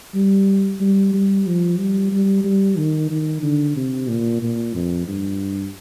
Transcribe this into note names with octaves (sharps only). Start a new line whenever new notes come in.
G3
G3
G3
F3
G3
G3
G3
D#3
D#3
D3
C3
A#2
A#2
F2
G2